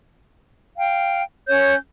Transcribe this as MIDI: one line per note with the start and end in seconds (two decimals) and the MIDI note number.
0.77 1.22 77
0.77 1.22 79
1.47 1.75 61
1.47 1.75 73
1.47 1.75 91